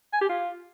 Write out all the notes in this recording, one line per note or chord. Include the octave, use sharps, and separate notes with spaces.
G#5
G4
F4